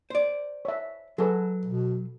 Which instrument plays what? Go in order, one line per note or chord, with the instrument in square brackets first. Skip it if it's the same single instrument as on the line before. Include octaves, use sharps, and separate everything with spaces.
[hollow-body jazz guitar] C5 D5
[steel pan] C#5 E5
[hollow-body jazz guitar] F#3 [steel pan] G#4 A4 B4
[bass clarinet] B2